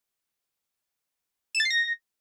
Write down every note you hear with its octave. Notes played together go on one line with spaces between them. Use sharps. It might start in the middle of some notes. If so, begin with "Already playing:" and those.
E7
A6
C7
A#6